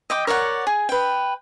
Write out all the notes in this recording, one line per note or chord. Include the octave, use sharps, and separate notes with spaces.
D#5 G5 D6
A#4 C#5 D5 F#5
G#4
B4 G5